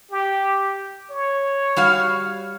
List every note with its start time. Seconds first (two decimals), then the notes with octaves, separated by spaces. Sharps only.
0.11 G4
1.11 C#5
1.76 G3 F#4 F5